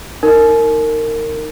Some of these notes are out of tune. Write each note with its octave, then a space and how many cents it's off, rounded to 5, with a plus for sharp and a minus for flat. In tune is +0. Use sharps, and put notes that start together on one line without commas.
D#4 +0 A#4 -25